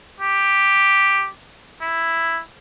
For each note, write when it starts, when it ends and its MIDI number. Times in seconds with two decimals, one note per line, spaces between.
0.20 1.29 67
1.81 2.40 64